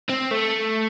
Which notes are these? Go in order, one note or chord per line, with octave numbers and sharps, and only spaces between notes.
C4
A3